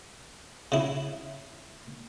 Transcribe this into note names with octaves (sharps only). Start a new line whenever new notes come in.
C#3 E4